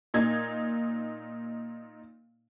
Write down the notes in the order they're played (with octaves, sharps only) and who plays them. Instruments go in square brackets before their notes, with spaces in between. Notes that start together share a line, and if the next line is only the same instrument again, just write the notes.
[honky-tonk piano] A#2 D#4 G#6